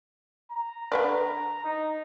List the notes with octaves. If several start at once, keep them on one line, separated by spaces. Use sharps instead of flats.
A#5
D3 B4 D5
D#4